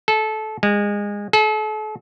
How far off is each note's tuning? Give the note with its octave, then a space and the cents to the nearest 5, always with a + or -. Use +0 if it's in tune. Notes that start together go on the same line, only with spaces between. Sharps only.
A4 -20
G#3 -25
A4 -40